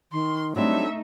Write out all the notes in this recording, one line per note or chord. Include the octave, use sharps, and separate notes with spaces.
D#3 C6
F#3 G3 A3 C4 D4 D#4 E5